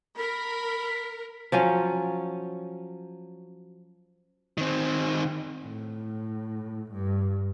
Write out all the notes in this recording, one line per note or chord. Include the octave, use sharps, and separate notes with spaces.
A#4 B5
F3 F#3 C#4
D#3 C4
A2
G2